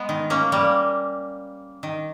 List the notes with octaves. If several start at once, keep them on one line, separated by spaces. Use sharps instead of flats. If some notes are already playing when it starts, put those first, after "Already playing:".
Already playing: G#3 B3
D#3
A#3 C#4
G3 A#3
D#3